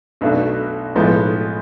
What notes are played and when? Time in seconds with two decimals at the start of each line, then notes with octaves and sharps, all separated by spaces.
0.21 B1 B2 A3 D4
0.95 B1 A2 F3 G#3 B3